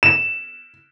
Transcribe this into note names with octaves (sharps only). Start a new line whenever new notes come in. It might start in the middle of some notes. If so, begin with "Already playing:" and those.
E7